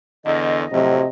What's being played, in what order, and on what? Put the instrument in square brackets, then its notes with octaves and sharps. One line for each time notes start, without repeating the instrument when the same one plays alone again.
[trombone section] E2 D3 [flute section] D#5
[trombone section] F2 A2 F#3 [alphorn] C3